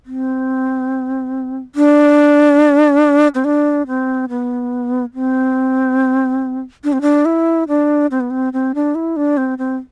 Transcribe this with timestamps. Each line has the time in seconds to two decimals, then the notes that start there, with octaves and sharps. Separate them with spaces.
0.06 C4
1.75 D4
3.35 C4
3.45 D4
3.87 C4
4.29 B3
5.15 C4
6.84 D4
6.93 C4
7.02 D4
7.25 E4
7.68 D4
8.11 C4
8.20 B3
8.30 C4
8.53 C4
8.75 D4
8.95 E4
9.16 D4
9.37 C4
9.58 C4